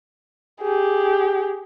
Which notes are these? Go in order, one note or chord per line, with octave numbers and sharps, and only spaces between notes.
G4 G#4